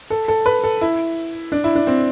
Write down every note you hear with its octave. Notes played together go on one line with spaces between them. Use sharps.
A4
A4
B4
A4
E4
D4
E4
D4
C4